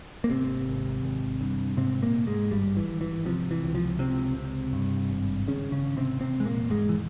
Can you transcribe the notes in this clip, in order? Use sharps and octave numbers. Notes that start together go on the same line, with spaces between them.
A#3
G#1 C3 C4
G#1
G#1
G2
G#2 C3 C4
A#2 A#3
G#2
G#2 G#3
G#1 G2 G3
E3
G#1
E3
C3 F3
E3
C#2
F3
C#2 C3 C4
C3
G2
G#1
G#1 C#3 C#4
C#3 C#4
G#1
C3 C4
E1 C3 C4
G#3
A#2 A#3
E1
G#2 G#3
E3